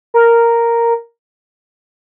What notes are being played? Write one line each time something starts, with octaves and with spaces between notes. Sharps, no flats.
A#4